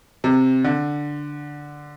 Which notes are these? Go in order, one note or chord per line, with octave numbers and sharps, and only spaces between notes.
C3
D3